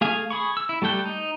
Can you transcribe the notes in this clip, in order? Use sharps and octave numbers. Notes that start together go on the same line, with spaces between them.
A3 G#4 F5 G#5
G#4 B5 C#6
E6
E4
G3 A3 A4 G5 F#6
D#4